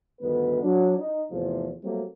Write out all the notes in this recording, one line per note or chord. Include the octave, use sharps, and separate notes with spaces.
D2 G2 D#3 B3 B4
F#3 D4
D#4
E2 A2 C3 F3
F#3 G3 A3 A#3 C4